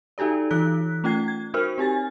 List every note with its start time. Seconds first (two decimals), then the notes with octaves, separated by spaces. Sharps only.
0.18 D#4 F#4 G4 A4 D5
0.51 E3 D#4 A4 C#5 F#6 B6
1.04 A3 C#4 F4 G5 G#6 C7
1.28 G#6
1.54 D#4 F#4 A#4 C5 F6
1.78 C4 G4 G#5 A6